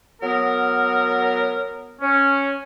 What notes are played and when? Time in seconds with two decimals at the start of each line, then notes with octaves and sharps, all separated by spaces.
0.22 F#3 B3 A#4
2.01 C#4